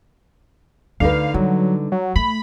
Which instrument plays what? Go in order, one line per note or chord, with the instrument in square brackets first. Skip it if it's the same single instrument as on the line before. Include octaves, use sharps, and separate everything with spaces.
[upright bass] D2 [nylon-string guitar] D3 D#4 B4 [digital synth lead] F5
[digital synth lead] F#3 [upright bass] G3
[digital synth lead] F#3
[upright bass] A3 [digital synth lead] B5